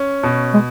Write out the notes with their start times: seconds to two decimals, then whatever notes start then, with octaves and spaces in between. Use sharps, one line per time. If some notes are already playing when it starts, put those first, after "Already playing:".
Already playing: C#4
0.23 B2
0.54 G#3